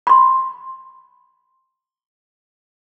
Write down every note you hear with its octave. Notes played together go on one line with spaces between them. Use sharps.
B5 C6